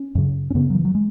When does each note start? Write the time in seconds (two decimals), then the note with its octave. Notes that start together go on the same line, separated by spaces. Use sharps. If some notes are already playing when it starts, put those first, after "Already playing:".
Already playing: C#4
0.15 F#2 C#3
0.50 C#4
0.55 F#2 C#3 B3
0.70 F#3
0.75 E3
0.85 F#3
0.95 G#3